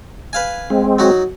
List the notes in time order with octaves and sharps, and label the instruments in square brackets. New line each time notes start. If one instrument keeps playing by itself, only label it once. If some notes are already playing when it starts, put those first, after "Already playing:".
[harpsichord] B4 F5 G#5
[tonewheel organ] G#3 C4
[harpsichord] F#3 D#4 F#4